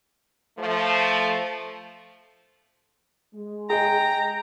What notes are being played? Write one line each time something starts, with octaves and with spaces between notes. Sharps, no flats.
F3 A3
G#3
G#4 D#5 G5 A#5